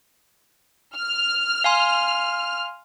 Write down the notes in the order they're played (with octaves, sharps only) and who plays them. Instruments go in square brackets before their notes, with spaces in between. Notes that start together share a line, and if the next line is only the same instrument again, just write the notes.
[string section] F6
[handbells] F5 G#5 C6